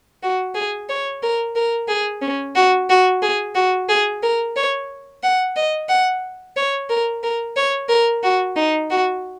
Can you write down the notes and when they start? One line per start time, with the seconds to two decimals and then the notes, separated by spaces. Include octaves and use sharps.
0.23 F#4
0.55 G#4
0.90 C#5
1.23 A#4
1.56 A#4
1.88 G#4
2.22 C#4
2.56 F#4
2.90 F#4
3.22 G#4
3.55 F#4
3.89 G#4
4.23 A#4
4.56 C#5
5.23 F#5
5.56 D#5
5.89 F#5
6.56 C#5
6.90 A#4
7.23 A#4
7.57 C#5
7.89 A#4
8.23 F#4
8.56 D#4
8.90 F#4